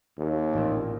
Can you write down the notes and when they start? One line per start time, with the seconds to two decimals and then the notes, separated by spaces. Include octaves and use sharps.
0.18 D#2
0.54 A1 A#2 C4